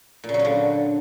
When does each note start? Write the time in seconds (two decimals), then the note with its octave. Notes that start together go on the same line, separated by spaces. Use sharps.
0.24 A#2
0.29 C#3
0.34 F#3
0.39 C#3
0.45 D3